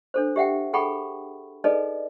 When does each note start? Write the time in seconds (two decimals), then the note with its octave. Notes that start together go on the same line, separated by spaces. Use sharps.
0.14 D4 A4 C5
0.36 G4 E5 F#5 G5
0.73 G#4 A4 F#5 G5 B5 C#6
1.64 D#4 G#4 A4 B4 D5 D#5